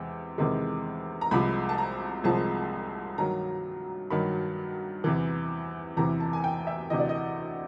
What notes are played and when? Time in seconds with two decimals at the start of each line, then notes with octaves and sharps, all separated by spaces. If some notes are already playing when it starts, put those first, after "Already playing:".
Already playing: E2 C3 G#3
0.38 E2 C3 D#3 G#3
1.21 A#5
1.31 C2 C3 F3 G#3 B5
1.69 A5
1.78 A#5
2.24 C2 C3 F3 G#3 A5
3.18 G2 D#3 F#3 A#5
4.10 G2 D#3 F#3 B5
5.04 E2 C3 E3
5.97 E2 C3 E3 A#5
6.20 A5
6.33 G#5
6.44 G5
6.67 E5
6.90 D2 C3 E3 D#5
7.00 D5
7.09 D#5